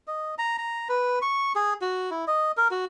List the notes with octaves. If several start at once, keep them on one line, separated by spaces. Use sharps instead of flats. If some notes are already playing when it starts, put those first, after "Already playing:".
D#5
A#5
A#5
B4
C#6
G#4
F#4
E4
D#5
A#4
F#4